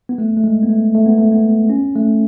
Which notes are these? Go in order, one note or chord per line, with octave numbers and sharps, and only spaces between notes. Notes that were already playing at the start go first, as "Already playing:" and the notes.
B3
A3
A3
G#3
B3
A3
A3
B3
A3
B3
C#4
A3